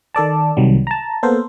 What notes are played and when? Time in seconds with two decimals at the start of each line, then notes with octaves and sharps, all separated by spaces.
0.15 D#3 A4 D5 A5
0.57 C2 C3 D#3 F#3 G3
0.87 A5 A#5
1.23 A#3 B3 A4 A#4 C5